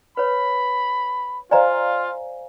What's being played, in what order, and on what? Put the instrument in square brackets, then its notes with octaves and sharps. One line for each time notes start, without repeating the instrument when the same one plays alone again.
[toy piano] B4 C#5 [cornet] B5
[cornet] F4 [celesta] C5 F5 G#5 [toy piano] D5 D#5 A#5